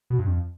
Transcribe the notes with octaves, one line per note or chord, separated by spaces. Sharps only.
B2
G2
F2